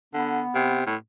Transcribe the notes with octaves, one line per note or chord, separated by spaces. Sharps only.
D3 B3
C3
A2